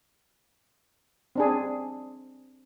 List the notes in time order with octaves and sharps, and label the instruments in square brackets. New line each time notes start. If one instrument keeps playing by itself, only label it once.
[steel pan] C4 D4 G#4